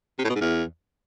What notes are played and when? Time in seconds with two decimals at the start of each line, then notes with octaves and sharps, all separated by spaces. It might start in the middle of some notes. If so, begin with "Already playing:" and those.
0.19 C3
0.24 A2
0.30 B2
0.35 G#2
0.41 E2